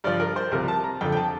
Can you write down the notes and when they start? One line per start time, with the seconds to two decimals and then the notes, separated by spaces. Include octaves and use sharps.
0.04 G2 F3 D5
0.20 A#4
0.36 C5
0.52 C2 C3 F3 A#4
0.68 A5
0.84 A#5
1.01 F2 D3 F3 G5
1.12 G5
1.17 A5